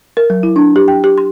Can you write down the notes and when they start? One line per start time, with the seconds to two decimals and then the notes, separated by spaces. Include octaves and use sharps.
0.17 A#4
0.30 F#3
0.43 E4
0.56 D4
0.76 G4
0.88 G5
1.04 G4
1.18 C6